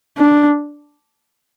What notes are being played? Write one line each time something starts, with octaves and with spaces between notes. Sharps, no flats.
D4